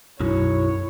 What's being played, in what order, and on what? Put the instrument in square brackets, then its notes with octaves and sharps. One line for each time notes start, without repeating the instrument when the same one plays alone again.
[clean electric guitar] B1 F#2 [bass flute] E4 [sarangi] C#5